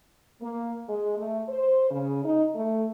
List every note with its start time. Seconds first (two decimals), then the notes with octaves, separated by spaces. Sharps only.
0.41 A#3
0.88 G#3
1.17 A3
1.49 C5
1.91 C#3
2.25 D#4
2.55 A3